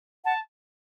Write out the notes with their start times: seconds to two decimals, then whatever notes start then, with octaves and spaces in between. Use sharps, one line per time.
0.25 F#5 A5